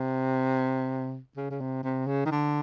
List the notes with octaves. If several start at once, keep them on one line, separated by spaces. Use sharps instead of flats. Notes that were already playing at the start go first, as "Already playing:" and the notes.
Already playing: C3
C#3
C#3
C3
C3
C#3
D#3
D3